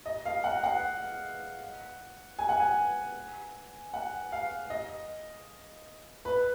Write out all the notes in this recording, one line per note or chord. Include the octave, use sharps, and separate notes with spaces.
D#5
F5
F#5
F#5
G#5
F#5
G#5
F#5
F5
D#5
B4